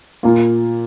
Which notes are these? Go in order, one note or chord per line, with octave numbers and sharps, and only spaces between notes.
A#2 A#3 F4